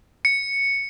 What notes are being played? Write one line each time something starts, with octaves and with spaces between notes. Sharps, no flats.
C#7